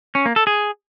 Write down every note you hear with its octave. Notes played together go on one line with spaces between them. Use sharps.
C#4
A#3
A4
G#4